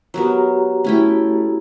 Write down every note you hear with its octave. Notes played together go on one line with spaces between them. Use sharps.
F#3 B3 F#4 G4 A#4 A#5
A3 C#4 E4 G5